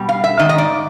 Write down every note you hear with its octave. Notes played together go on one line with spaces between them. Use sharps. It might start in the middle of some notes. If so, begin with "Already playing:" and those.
Already playing: B2 G3
F5
E5
G#2 D#3 D#5
D#5
D5